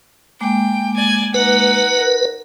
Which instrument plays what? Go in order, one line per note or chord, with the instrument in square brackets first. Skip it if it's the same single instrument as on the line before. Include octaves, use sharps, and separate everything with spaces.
[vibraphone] G#3 A#3 D6 [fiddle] G5
[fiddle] D5 G#5
[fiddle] D#4 F#5 [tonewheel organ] B4
[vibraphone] A#4